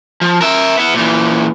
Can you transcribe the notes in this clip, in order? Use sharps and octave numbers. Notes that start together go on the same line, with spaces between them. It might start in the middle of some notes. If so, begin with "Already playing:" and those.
F3
A#4 E5
B3 E4
A#2 E3